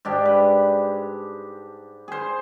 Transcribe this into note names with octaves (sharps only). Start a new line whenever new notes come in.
G#2 D4 G4
B4
G#4 C5